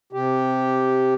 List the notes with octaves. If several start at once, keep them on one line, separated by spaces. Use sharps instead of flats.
C3 G4